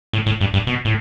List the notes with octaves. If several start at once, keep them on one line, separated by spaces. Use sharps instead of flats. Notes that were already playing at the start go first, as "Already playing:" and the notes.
A2
A2
G2
G2
B2
A2